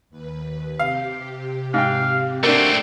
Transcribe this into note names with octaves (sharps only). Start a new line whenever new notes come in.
D#2 B4
C3 G4 F5
G#2 F5 G5
A3 A#3 C4 D4 F#4